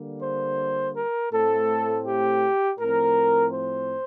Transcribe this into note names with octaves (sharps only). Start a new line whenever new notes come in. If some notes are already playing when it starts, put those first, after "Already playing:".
Already playing: D3 G3 A#3
C5
A#4
A2 A3 C4 A4
G4
A2 F3 C4 A#4
C5